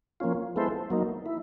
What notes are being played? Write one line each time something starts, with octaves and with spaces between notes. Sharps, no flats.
F3 A#3 C#4 F4
G#3 B3 E4 A4 C5
F#3 A#3 D#4
E4